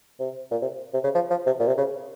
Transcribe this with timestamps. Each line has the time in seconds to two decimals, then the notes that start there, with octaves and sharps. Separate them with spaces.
0.19 C3
0.51 A#2
0.62 C3
0.93 C3
1.04 C#3
1.15 F3
1.30 F3
1.46 C3
1.60 A#2
1.67 C3
1.78 C#3